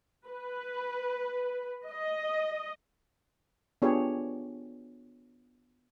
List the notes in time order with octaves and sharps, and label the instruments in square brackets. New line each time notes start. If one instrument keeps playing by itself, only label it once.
[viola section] B4
D#5
[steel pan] B3 D4 F4 G4 G#4 C#5